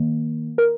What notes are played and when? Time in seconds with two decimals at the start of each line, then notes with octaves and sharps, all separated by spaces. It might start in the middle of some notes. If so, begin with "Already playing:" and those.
Already playing: D#3 A#3
0.58 A#4